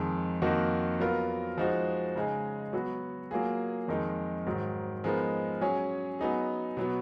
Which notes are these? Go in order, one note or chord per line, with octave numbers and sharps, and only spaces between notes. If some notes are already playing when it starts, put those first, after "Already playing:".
Already playing: F2 D#3 G#3
F2 D#3 A#3 D#4 F#4
F#3 B3 F4 A#4
F3 G#3 D#4 F#4
C#3 G#3 D#4 G#4
F#3 B3 F#4
F#3 A#3 F4 G#4
F2 D#3 G#3 D#4 A#4
G#2 D#3 F#3
F3 G#3 B3 D#4 A#4
F#3 C#4 G#4
F#3 B3 D#4 G#4
B2 F#3 B3